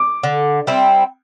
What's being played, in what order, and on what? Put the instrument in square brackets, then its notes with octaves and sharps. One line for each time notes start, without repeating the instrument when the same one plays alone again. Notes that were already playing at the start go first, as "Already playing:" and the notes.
Already playing: [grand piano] D6
[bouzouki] D3
G3 C4 E4